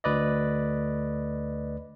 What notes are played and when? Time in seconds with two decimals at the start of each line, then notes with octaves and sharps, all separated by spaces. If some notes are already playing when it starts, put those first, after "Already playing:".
0.04 D2 B4 D5 D#5